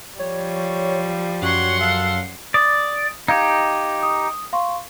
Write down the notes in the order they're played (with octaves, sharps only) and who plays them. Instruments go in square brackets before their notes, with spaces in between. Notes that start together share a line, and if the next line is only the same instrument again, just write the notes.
[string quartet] F3 G3 [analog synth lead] C#5
[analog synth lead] F#2 [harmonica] C#5 [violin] F#5 C6
[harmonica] A4 F5
[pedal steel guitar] D5 [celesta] D#6
[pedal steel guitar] D#4 G4 [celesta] F5 G6 G#6
[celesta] D#6
F5 C6 C#6